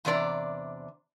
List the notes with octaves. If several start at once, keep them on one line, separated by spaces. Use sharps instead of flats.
E2 C3 D4 D5 A#5